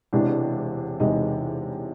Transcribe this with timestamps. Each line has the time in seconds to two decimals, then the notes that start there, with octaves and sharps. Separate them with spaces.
0.13 E1 E2 C3 E3 G#3 D4
0.99 E1 E2 C3 E3 G#3 D#4